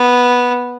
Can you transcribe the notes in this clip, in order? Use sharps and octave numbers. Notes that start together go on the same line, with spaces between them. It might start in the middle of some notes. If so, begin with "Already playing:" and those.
Already playing: B3